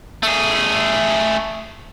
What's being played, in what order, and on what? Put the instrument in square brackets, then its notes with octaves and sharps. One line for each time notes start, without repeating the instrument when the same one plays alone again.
[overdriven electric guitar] A3 G#4